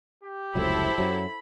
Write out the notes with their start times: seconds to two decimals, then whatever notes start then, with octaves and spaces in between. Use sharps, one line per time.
0.23 G4
0.55 F1 C#2 F#3 E4 A4 C5 B5
0.98 F#2 F#3